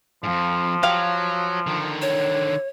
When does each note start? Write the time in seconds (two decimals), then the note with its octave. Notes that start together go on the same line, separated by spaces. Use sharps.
0.24 F2 G#2 F3
0.83 F#3 G4 F5
1.67 D3 D#3
2.02 C#5